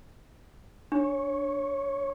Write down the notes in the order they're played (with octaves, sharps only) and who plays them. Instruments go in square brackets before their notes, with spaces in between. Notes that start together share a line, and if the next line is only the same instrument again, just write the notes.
[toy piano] D4 [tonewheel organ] C#5